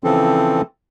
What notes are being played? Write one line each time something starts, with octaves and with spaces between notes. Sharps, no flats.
C#3 E3 F3 C4 A4